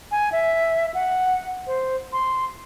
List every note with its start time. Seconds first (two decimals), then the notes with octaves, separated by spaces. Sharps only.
0.11 G#5
0.32 E5
0.94 F#5
1.67 C5
2.13 C6